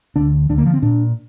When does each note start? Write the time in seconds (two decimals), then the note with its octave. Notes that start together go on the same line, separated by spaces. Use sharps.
0.16 D2 D3 D4
0.49 D2 D3 D4
0.58 A#3
0.66 F3
0.73 C4
0.82 A#2 D4